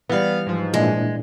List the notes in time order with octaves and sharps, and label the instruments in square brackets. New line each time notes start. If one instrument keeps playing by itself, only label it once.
[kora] E3 G3 [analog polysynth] B3 F5
[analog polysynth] G#2 F3
[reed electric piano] A#2 D4 E4 [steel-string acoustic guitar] G#3